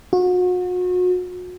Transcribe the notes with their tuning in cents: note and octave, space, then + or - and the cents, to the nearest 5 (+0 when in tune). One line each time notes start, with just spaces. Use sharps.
F#4 -35